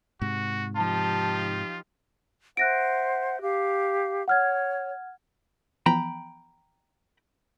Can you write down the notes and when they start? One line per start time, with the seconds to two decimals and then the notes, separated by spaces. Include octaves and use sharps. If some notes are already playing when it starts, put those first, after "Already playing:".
0.22 G#2 C3 F#4
0.77 F3 D#4 F4 G4 A5
2.57 C5 E5 F#5 F#6 A#6 D7
3.42 G4 F5
4.28 C#5 F#5 F6 G#6
5.86 E3 F3 B3 G5 A#5 B5